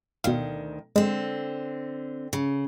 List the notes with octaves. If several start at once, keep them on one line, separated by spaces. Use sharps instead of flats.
D2 B2 D#3 F5
D3 G#3 C4
C#3